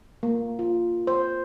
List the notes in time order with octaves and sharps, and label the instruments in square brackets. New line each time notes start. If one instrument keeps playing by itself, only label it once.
[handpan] A#3
F4
C5